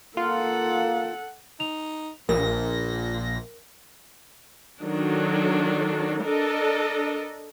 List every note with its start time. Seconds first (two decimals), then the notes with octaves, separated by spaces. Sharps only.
0.17 A#3 F4 A4 F#5
1.60 D#4 F7
2.29 A#1 A#2 A#4 A#6
4.81 D#3 F#3 D4 A4
6.24 D4 A4 A#4 D#5